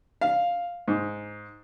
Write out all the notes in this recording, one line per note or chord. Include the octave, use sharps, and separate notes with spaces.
F5
G#2